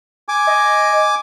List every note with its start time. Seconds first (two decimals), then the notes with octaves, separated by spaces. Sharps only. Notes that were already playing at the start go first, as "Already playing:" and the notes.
0.28 G#5 D6
0.47 D#5